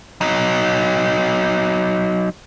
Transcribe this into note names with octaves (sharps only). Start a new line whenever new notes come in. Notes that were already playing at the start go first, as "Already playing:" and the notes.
F#3 D#4